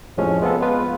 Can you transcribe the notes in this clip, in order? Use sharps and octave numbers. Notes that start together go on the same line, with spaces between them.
F2 A2 C3 F3 G#3 C#4
G#3 B3 C4 F4 A4
G#3 B3 F4 B4